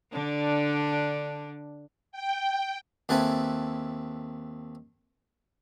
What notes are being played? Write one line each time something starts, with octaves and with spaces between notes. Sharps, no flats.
D3 D4
G5
D#2 C4 E4 A4 B4 G#5